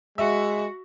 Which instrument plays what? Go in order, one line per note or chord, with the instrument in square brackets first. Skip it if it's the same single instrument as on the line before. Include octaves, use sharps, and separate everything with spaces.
[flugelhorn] G#3 [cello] F#4 [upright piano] E5 F#5